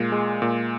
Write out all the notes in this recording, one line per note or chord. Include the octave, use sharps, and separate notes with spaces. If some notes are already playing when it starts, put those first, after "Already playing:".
Already playing: A#2 G#3
G#3
A#2